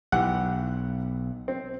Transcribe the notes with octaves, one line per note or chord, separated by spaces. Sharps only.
B1 E3 G4 F#5
C4